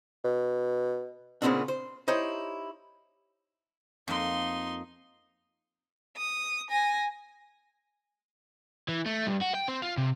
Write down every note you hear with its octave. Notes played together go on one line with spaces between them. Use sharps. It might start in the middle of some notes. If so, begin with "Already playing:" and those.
B2
A#2 C#3 F#3 B3 C4 D4
C5
D#4 E4 G4 C5 C#5
F2 A#3 D#4 C6
D#6
G#5 A#6
E3
A3
G2
F#4
G5
C4
F4
C3